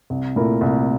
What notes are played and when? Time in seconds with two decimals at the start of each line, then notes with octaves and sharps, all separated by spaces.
0.10 C2
0.36 A#2 A3 E4 A#4
0.61 C2